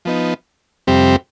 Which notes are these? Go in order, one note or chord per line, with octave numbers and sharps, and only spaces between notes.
F3 B3 D#4
F2 C3 G3 C4 G4